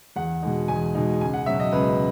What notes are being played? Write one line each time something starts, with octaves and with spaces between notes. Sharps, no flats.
E2 F#5
B2 G#3 D#4
E2 G#5
B2 G#3 D#4
C#2 G#5
F#5
B2 F#3 E5
D#5
C#2 B4